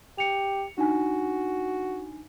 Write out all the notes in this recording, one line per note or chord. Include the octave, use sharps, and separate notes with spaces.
G4 C#7 F7
D4 D#4 F#4 G#5